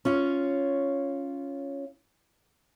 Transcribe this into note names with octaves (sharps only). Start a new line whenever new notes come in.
C#4 F4 C#5